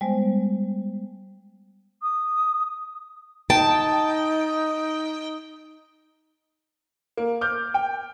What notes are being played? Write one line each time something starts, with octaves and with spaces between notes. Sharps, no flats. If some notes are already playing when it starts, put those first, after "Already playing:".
G3 G#3 B3 C5
D#6
D#4 G5 A5
A#3
D6 F6 G6
G5